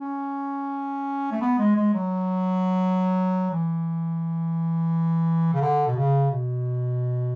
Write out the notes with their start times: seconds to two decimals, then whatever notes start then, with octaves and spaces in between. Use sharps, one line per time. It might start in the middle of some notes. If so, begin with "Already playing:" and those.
0.01 C#4
1.31 A3
1.41 B3
1.59 G#3
1.76 G#3
1.94 F#3
3.51 E3
5.54 C#3
5.61 D3
5.87 B2
5.96 C#3
6.31 B2